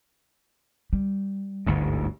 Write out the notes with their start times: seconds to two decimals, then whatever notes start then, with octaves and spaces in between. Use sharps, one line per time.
0.93 G3
1.66 G1 D2 G#2